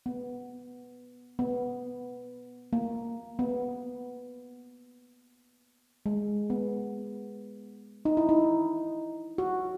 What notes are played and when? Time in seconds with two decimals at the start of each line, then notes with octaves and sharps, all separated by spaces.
0.06 B3
1.39 B3
2.73 A#3
3.39 B3
6.06 G#3
6.50 B3
8.05 D#4
8.17 E4
8.29 D#4
9.38 F#4